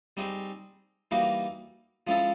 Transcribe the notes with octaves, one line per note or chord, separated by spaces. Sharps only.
G3 C4 D#4 G#4
E3 G3 A#3 D#4 F#4
F3 G#3 C#4 E4 A4